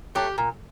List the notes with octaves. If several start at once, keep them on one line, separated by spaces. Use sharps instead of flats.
F#3 A3 G4
A#2